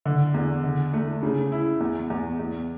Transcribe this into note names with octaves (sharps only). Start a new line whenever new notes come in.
D3
E2
D3
A3
C#3
E4
E2
E2
E2